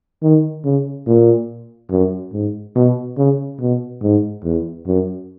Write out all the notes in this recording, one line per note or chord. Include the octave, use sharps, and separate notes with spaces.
D#3
C#3
A#2
F#2
G#2
B2
C#3
B2
G#2
E2
F#2